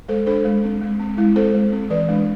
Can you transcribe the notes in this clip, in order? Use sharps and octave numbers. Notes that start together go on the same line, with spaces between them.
G#3 A4 C5
D4 A4 C5
G#3
C4
G#3
C4
G#3 E4
C4 A4 C5
G#3
C4
E3 B4 D5
G#3 D4